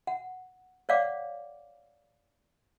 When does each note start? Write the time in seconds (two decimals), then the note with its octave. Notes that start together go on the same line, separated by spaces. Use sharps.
0.07 F#5
0.89 C#5 D5 F5 F#5 D6